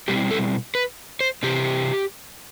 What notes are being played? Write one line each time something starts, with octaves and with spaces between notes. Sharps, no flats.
B2 G3 C4 E4 G4
A4
B4
C5
C3 E3 C4 G4